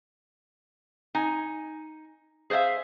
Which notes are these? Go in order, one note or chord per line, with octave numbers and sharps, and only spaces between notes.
D#4 G#5
G#4 C5 D5 E5 F5